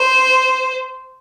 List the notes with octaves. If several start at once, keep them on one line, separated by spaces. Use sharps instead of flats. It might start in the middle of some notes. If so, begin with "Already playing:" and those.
Already playing: C5